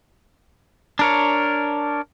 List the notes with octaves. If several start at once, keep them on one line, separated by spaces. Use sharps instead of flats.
D4 A#4 C#5